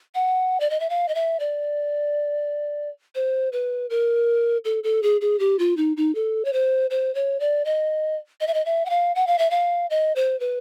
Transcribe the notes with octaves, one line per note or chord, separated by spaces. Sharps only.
F#5
D5
D#5
E5
F5
D#5
E5
D5
C5
B4
A#4
A4
A4
G#4
G#4
G4
F4
D#4
D#4
A4
C#5
C5
C5
C#5
D5
D#5
D#5
E5
D#5
E5
F#5
F5
F#5
F5
E5
F5
D#5
C5
B4